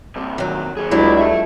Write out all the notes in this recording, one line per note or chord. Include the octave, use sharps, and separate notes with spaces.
G2 C3
D#3 F#3
A#2 G#4
C#2 F#3 G3 D4 E4
E5 A5